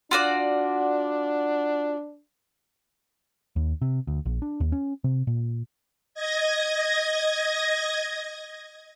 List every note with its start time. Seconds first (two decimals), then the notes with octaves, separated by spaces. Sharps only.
0.11 D4 F4 F#4 D5
3.56 D#2
3.82 C3
4.07 D2
4.26 A#1
4.42 D4
4.60 D#2
4.72 C#4
5.04 C3
5.27 A#2
6.14 D#5 G#6 A#6